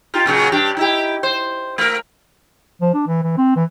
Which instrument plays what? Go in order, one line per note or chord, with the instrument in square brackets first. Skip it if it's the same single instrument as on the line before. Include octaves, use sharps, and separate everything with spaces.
[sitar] D#4 F4 G4
A#2 C#3 F#3
G2 D4 G4
D#4 E4 G4
C5
A3 A#4
[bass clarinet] F3
D4
E3
E3
C4
E3